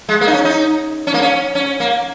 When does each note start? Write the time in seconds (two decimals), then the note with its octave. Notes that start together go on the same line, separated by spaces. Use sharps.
0.09 G#3
0.21 A#3
0.27 D#4
0.33 C#4
0.45 D#4
1.07 C#4
1.14 A#3
1.22 C#4
1.55 C#4
1.80 A#3